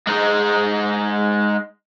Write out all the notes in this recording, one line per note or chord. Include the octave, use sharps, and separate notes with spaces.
G#3 D#4